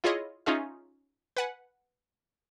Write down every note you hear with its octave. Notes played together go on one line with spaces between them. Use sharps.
E4 F4 G#4 C#5 D#5
C#4 D#4 F4 G#4 E5
B4 F#5 G#5